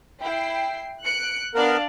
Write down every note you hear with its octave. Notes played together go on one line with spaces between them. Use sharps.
E4 G5 C7
F#6 C#7 D7
B3 D4 A#4 D5 F5